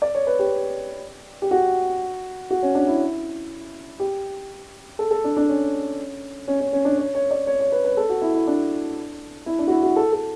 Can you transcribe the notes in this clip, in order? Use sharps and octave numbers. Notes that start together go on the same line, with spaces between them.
D5
C#5
B4
G4
G4
F#4
F#4
C#4
D4
E4
G4
A4
A4
D4
D4
C#4
C#4
C#4
C#4
D4
C#5
C#5
D5
C#5
C#5
B4
B4
A4
F#4
E4
E4
D4
E4
D4
F#4
E4
F#4
A4
A4